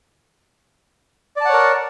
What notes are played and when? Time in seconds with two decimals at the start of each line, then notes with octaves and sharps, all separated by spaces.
1.36 D5
1.41 A5
1.45 F#5
1.49 C#5
1.53 A#4